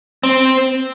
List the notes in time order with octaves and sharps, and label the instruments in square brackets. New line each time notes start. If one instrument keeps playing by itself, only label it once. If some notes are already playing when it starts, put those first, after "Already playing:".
[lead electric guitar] C4